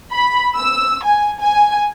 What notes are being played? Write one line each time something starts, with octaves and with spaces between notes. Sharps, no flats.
B5
E6
G#5
G#5